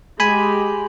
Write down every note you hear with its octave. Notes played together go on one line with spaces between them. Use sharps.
G#3 G4 G#5 B5